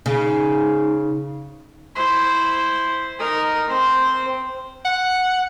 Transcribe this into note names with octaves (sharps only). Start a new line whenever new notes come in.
C#3 D#4
E4 C5
D#4 A#4
C4 C5
F#5